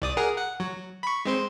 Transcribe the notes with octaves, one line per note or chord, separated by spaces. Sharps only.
C2 D5 D#6
G#4 A#4 F#5
F#5
F#3
B5 C#6
G#3 C4 C5